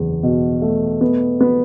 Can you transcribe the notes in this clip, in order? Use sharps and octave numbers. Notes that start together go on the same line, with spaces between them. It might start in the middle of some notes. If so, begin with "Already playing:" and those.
Already playing: F#1 E2
B2
A3
B3
B3